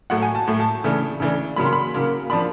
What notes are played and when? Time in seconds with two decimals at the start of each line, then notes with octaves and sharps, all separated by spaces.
0.10 A2 F#3 A3 F#5
0.22 G#5
0.35 A5
0.47 A2 F#3 A3
0.60 A5
0.84 C#3 E3 A3 D4
1.20 C#3 E3 A3 D4
1.56 C#3 F#3 A#3 B5
1.65 C6
1.73 B5
1.94 C#3 F#3 A#3
2.30 F3 A#3 D4 B5